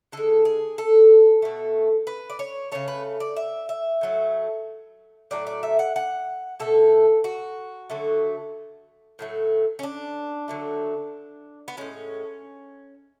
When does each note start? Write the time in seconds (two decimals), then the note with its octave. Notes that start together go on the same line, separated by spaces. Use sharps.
0.12 D3 G#3 A4
0.45 G#4
0.78 A4
1.42 B2 A3
2.07 B4
2.30 D5
2.39 C#5
2.72 C#3 F#3 A3 C#5
2.88 B4
3.20 D5
3.36 E5
3.69 E5
4.01 A2 F#3 A3
5.31 A2 F#3 A3 D5
5.47 D5
5.63 E5
5.79 F#5
5.96 F#5
6.60 B2 A3 A4
7.24 F#4
7.90 D3 F#3 A3
9.19 A2 F#3 A3
9.79 C#4
9.83 D4
10.48 D3 F#3 A3
11.68 B3
11.77 A2 G#3 C#4